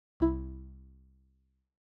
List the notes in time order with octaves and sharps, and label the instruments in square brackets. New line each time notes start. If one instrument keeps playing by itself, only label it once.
[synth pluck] C2 E4